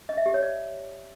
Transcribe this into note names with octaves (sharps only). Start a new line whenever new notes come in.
D#5
E5
G4
C#5
D5